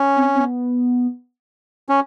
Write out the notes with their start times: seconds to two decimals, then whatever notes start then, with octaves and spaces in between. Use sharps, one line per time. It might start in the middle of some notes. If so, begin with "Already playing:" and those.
Already playing: C#4
0.16 C4
0.35 C4
0.40 B3
1.89 C#4